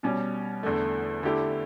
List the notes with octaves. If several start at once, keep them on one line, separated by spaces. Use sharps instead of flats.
B2 G3 C#4
E2 D3 A3
D3 A3 E4 G4